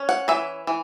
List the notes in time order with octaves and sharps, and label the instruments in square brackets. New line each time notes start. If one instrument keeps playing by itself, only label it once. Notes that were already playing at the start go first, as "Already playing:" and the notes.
Already playing: [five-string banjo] C#4
F#5
E3 E5
E3